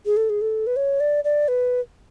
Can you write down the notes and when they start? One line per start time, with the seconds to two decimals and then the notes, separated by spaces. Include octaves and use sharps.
0.06 G#4
0.17 A4
0.30 G#4
0.41 A4
0.67 B4
0.76 C#5
1.00 D5
1.24 D5
1.48 B4